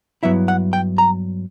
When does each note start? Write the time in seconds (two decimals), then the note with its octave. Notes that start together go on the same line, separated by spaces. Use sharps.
0.23 G2 F#3 B3 E4 E5
0.48 F#5
0.73 G5
0.98 A#5